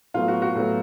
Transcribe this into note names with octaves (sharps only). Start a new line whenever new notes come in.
A2 F#3 B3 F4
F#4
F#4
A2 F#3 B3